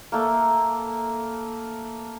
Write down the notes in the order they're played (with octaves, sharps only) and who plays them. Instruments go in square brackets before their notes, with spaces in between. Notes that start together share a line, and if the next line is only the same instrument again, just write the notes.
[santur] A3 A#3